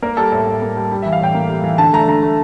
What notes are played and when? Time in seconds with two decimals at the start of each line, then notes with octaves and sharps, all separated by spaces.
0.02 A#3 A#4
0.17 G3 A4
0.32 A2 A4
0.47 A2
0.62 A#3
0.76 G3
0.91 G3
1.02 E5
1.06 E3
1.13 F5
1.20 A2 G5
1.34 A#3
1.49 G3
1.64 E3
1.78 D3 A5
1.93 A3 A#5
2.08 D3 A#5
2.22 A3